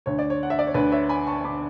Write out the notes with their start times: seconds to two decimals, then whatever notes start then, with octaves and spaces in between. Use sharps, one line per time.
0.06 D2 D3 C#5
0.19 D5
0.30 C#5
0.43 F#5
0.50 E5
0.59 D5
0.67 C#5
0.74 D2 D3 B4
0.92 C#5 E5
1.09 G#5 B5
1.27 A5 C#6
1.44 D3 B5 D6